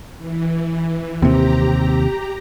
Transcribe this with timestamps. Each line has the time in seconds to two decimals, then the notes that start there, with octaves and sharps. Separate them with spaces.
0.18 E3
1.22 D#2 C3 C4 G4 A#5